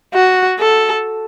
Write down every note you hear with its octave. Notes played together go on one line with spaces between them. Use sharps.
F#4
A4